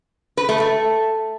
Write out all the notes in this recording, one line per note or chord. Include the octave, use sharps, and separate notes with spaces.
B4
A3
A3